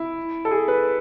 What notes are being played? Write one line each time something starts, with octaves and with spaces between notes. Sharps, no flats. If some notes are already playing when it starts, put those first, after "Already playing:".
Already playing: E4
A4
G#4
B4